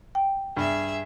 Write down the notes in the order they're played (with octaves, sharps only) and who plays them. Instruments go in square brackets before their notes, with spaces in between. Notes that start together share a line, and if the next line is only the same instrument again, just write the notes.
[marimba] G5
[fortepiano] G2 [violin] G#4 E5